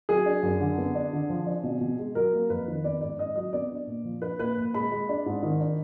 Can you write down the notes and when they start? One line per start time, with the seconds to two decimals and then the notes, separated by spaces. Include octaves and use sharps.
0.09 F#3 G#4
0.26 D4
0.43 F#2
0.60 D3
0.78 B3
0.95 D4
1.13 D3
1.30 F3
1.46 D4
1.63 B2
1.81 B2
1.99 G#3
2.15 F#3 A#4
2.33 A#3
2.50 F2 B4
2.68 D#3
2.84 B3 D5
3.01 G#2 D5
3.18 G#2 D#5
3.36 F#3 D#5
3.53 B3 D5
3.71 D4
3.87 A#2
4.05 F3
4.22 D4 B4
4.39 A#2 B4
4.57 A#2
4.74 G#3 B5
4.92 G#3
5.09 D4
5.26 G#2
5.43 D#3
5.60 D4